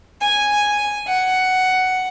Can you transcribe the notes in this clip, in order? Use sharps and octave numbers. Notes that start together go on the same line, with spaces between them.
G#5
F#5